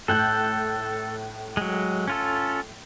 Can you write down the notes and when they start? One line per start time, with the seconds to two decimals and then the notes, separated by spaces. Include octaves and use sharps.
0.08 A2 A4 F#6 G6
1.57 F#3 G#3
2.08 C#4 F4 A4